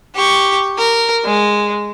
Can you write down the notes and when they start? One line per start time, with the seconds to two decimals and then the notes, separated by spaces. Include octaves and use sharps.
0.15 G4 C#6
0.78 A#4
1.25 G#3